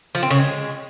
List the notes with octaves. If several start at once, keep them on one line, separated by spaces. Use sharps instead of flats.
F3
C4
C#3
G#3